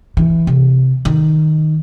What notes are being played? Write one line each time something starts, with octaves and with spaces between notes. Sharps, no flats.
E3
C3
D#3